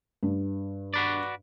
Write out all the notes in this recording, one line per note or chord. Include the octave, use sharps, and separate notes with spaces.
G2
F#4 B4 D5